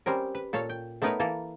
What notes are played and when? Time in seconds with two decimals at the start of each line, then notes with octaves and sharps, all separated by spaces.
0.06 G3 C4 C#4 A#4
0.35 B4
0.53 A#2 A4 C#5 F5
0.69 G5
1.02 A3 B3 D#4 A#4 B4 C#5
1.20 E3 A#3 E4 A4 A#5